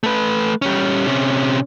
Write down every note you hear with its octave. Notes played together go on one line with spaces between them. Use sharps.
A3 B4
G3 C#4
C3 C#4